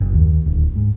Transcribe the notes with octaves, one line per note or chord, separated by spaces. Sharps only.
F#1
D#2
D1
G#2